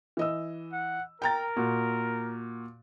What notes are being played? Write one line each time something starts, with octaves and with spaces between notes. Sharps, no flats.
E3 D#5 E6
F#5
A#4 G5 A#5 A6
A#2 F#4